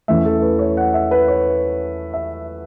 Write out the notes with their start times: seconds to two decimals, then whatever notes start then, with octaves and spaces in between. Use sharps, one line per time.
0.08 E2 E3 A3 C#4 E5
0.25 A4
0.42 B4
0.59 C#5
0.77 F#5
0.94 E5
1.11 B4
1.28 C#5
2.14 E5